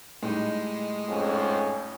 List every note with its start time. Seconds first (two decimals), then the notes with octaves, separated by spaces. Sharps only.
0.23 A2 G3 G#3 D#4
1.09 F2 G#2 C#4